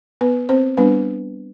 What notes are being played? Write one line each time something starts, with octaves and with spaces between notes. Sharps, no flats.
B3 B4
C4 C5
G3 B3 D4 B4